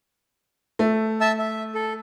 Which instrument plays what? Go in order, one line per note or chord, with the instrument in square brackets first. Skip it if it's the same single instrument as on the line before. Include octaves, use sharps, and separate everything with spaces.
[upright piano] A3
[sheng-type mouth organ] E5 A5 E6
E5
A4